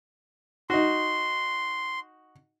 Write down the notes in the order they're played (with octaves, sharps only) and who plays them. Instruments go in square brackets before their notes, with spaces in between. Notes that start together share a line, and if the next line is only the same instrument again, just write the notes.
[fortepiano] D#4 F#4 [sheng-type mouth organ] C6